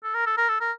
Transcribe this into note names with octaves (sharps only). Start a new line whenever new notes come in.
A4
A#4
A4
A#4
A4
A#4